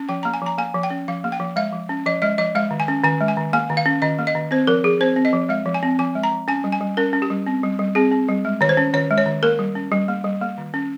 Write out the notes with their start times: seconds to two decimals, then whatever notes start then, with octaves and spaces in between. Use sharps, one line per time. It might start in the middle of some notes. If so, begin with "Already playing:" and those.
Already playing: C#4
0.09 F3 G5
0.23 A#3 A#5
0.34 G#5
0.42 F3 A#5
0.58 A#3 G#5
0.74 F3
0.83 G5
0.90 C#4
1.08 F3 F5
1.24 A#3
1.32 G5
1.40 F3
1.56 G#3 F5
1.73 F3
1.89 C#4
2.06 F3 D#5
2.22 G#3 D#5
2.38 F3 D#5
2.55 G#3 F5
2.71 D#3
2.80 G#5
2.88 C#4
3.04 D#3 G#5
3.21 G#3
3.28 G#5
3.37 D#3
3.53 A#3 G#5
3.70 D#3
3.77 F5
3.86 C#4
4.02 D#3 D#5
4.19 A#3
4.27 D#5
4.35 D#3
4.51 C4 C5
4.67 F3 A#4
4.84 F3 G#4
5.01 C4 C5
5.16 C4
5.25 D#5
5.33 F3
5.49 G#3 F5
5.66 F3
5.74 G#5
5.83 C4
5.99 F3 G#5
6.15 G#3
6.23 A#5
6.32 F3
6.48 C#4 G#5
6.64 G3
6.72 G#5
6.81 G3
6.97 C#4 A#4
7.13 C#4
7.22 G4
7.30 G3
7.47 C4
7.63 G3
7.79 G3
7.95 C4 G#4
8.12 C4
8.29 G3
8.45 G#3
8.61 D#3 C#5
8.69 C5
8.77 C#4
8.94 D#3 C#5
9.11 G#3
9.18 C#5
9.26 D#3
9.43 A#3 A#4
9.59 G3
9.75 C#4
9.92 G3
10.08 A#3
10.24 G3
10.41 A#3
10.58 D#3
10.74 C#4